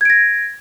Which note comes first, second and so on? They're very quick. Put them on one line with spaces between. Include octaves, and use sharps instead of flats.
G#6 D7 A#6